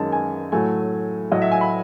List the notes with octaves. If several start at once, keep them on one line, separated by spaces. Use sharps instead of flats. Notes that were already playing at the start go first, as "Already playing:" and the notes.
Already playing: F#2 D#3 G#3 A5
G#5
A2 F#3 A3 G#5
A2 F#3 A3 D#5
E5
G#5
B5